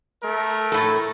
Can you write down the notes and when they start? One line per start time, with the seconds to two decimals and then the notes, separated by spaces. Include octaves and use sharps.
0.23 A3 A#4
0.72 A2 A4